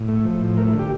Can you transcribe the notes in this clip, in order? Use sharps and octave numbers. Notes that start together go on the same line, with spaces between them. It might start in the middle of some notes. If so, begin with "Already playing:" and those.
Already playing: A2
A3
F3
A2
A3 A#4
E4
D3
G4